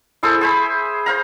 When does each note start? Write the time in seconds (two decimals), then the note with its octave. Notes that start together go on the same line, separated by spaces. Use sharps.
0.23 E4 G#4 A4 C5
0.41 G#4 C5 B5
1.06 C5 F5 A#5